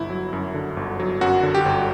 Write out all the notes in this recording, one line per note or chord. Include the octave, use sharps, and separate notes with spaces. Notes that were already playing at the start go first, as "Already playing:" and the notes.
Already playing: G1 E4
F#3
F#2
D3
G1
F#3
F#2 F#4
D3
G4
G1